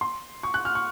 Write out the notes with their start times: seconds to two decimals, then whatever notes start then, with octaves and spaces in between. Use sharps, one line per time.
0.01 C6
0.43 C#6
0.54 F#6
0.65 F6
0.75 C#6